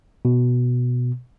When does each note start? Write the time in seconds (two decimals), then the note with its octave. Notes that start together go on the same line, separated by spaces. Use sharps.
0.25 B2